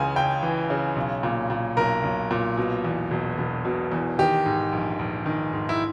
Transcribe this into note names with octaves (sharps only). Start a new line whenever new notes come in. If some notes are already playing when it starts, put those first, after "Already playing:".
Already playing: C#2 C#3 E3 G#5
C#2 G5
E3
C#3
B1
A#2
A#2
B1 A#4
B1
A#2
B2
E2
E1
E1
B2
E2
D#3 G4
G#2
A#1
A#1
D#3
G#2
E4